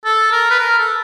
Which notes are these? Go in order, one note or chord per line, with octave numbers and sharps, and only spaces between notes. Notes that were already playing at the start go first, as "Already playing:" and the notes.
A4
A#4
B4
A#4
A4